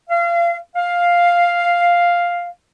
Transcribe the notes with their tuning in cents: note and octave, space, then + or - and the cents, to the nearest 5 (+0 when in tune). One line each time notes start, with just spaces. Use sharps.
F5 -30
F5 +0